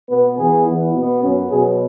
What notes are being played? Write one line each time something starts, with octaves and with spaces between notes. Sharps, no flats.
B2 B3 B4
E2 E3 B3 G#4
E2 E3 B3
B2 B3
F#2 F#3 B3 C#4
B2 F#3 B3 G#4